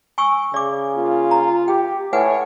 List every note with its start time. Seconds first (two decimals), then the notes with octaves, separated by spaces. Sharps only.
0.18 G#5 C#6 E6
0.54 C#3 D5 D6
0.96 A#3 F4
1.31 A#5
1.68 G4 G5
2.13 A2 B4 C#5 F#5 G#5